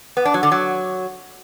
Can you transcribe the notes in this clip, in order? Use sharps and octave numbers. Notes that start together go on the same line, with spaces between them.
B3
D4
F#3
D3
F#3